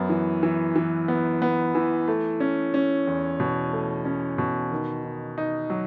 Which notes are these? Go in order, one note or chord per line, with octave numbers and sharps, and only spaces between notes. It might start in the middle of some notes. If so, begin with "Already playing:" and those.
Already playing: F#2 B3
E3
E3
E3
B3
B3
E3
A3
C#4
C#4
E2
B2
A3
C#4
B2
D#3
D#3
D#4
F#3